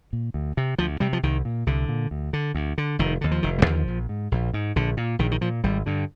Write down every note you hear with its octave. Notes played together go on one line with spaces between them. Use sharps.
A#2
D2
C3
D2 F3
C3 G3
F3
C2 D#3
A#2
C2 D3
A#2
D2
D3
D2
D3
F1 D#3
D#2 D3
F3
F1 D#3
G3
D#2 D3 F3
A#1
G#2
A#1
G#2
A#1 D3
A#2
A#1 D#3
D#3
A#2 F3
G#1 G3
G2 D3